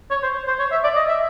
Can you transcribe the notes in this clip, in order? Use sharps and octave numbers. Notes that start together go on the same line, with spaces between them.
C#5
C5
C5
C#5
E5
D5
D#5
E5